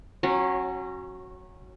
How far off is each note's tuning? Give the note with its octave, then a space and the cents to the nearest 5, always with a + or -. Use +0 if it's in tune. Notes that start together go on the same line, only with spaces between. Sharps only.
F#3 +0 C#4 -25